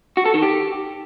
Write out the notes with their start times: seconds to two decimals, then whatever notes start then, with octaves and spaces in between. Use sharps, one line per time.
0.17 F#4
0.26 A4
0.34 D#3
0.42 G4